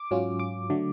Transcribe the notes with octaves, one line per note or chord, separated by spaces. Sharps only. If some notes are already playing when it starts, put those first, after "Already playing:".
Already playing: D6
G#2 F#3 C#4 F4
D6
D3 F#3 A3